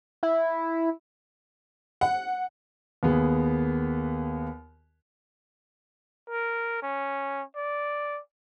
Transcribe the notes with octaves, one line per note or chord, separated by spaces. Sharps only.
E4
F#5
D#2 B3 G#4
A#4
C#4
D5